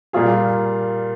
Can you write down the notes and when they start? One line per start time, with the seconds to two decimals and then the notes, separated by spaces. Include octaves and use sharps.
0.13 A#2 G3 A#3 F4 G#4